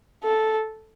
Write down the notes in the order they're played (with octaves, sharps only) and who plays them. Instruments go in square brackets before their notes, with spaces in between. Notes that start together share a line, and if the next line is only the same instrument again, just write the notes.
[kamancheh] A4